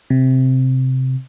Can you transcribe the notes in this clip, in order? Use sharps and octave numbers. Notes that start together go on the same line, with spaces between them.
C3